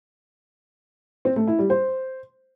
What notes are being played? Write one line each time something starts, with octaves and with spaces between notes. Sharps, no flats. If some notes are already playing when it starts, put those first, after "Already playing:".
C4
A3
E4
G3
C5